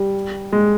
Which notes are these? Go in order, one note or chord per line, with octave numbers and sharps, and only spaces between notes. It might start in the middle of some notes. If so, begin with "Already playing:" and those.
Already playing: G3
G#3